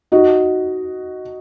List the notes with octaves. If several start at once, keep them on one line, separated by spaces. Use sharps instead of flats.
D#4 F#4